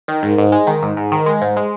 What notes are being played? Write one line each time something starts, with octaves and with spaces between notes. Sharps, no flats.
D#3
G#2
G#2
G#3
D#3
G#2
G#2
D#3
G#3
G#2
G#3